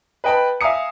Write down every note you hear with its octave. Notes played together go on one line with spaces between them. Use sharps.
B4 D#5 G5 A5 B5
E5 F5 G#5 A#5 D#6 C#7